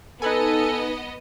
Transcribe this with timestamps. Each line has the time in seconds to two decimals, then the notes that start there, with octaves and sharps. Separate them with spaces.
0.22 B3 D#4 A4 B4 D#5 G#5